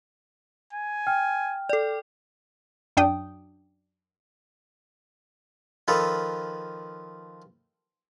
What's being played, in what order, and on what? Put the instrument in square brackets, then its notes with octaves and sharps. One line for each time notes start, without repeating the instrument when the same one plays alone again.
[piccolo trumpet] G#5
[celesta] G5 F6
[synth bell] A4 D5
[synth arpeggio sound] F#2 D4 G5 D#6
[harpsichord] D#3 F3 A4 B4